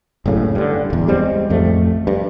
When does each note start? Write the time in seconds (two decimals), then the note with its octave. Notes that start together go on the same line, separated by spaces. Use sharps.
0.26 F#1 C2 A2 C#3
0.55 G2 D3
0.90 D1 E2
1.08 G3 G#3 C4
1.50 A1 F2 A3
2.07 G2